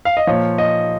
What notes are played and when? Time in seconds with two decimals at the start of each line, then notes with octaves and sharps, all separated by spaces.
0.05 F5
0.17 D#5
0.27 A#2 F3 C#5
0.58 D#5